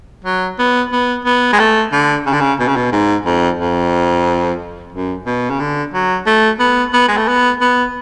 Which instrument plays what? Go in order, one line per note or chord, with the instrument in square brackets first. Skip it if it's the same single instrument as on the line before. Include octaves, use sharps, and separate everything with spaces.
[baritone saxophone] F#3
B3
B3
B3
G#3
A3
D3
C#3
D3
C#3
B2
C#3
B2
G#2
F2
F2
F#2
B2
C#3
D3
F#3
A3
B3
B3
G#3
A3
B3
B3